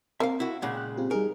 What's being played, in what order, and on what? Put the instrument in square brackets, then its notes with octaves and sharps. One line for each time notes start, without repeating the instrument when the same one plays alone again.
[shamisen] A#3 [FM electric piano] C4 [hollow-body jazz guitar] E5 F5
[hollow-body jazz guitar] E4 F#4
[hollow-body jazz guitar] A#2 C#3 G#3 [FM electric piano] F#5 G#6
[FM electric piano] G5 F#6
C4 F4 G4
[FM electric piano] G3 D#4 G#4 [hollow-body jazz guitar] A#4